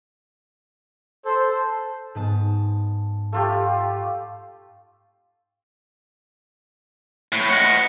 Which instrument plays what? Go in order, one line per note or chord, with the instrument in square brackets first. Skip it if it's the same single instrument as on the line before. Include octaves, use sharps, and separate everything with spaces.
[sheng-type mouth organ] A4 [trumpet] C5
[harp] G#2 B3 A5
[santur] A3 F4 G4
[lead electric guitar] A2
D#5 F#5